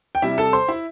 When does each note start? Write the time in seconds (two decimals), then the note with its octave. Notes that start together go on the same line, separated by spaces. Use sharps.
0.15 G5
0.22 C3 G3 E4 E5
0.38 A4 A5
0.53 C5 C6
0.68 E4 E5